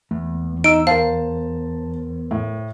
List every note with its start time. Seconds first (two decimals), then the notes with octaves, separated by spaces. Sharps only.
0.11 E2 A3
0.64 D#4 E6 D7
0.87 A#4 C5 F5 A5
2.31 A2